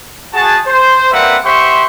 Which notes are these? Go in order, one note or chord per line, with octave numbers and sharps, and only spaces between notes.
F#4 G#4 A5
C5
G3 A#3 C4 B4 E5 F#5
G4 C5 E5 F#5 C6 C#6